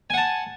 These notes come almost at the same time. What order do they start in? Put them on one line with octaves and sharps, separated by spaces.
G#5 F#5 A5